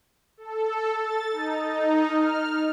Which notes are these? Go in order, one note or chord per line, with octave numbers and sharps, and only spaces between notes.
A4
A6
D#4
D#4
F6